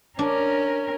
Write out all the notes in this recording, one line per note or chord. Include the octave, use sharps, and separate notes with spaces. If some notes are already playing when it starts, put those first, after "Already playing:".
C#4 D4 A#4